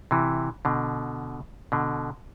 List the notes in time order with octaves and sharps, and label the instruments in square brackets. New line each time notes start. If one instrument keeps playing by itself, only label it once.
[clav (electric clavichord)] C3 E3
B2 D3
B2 D3